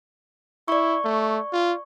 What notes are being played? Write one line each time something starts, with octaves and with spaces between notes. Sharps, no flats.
E4 D5 C#6
A3
F4